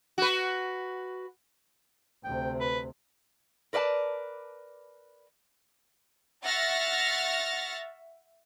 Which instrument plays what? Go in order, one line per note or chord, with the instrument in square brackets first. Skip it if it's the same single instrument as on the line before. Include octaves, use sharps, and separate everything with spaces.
[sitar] F#4 B4
[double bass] D2 C3 [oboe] G5
[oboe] B4
[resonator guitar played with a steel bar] A#4 B4 D5 E5 A5
[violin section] E5 F#5 C#6 F6 A6 A#6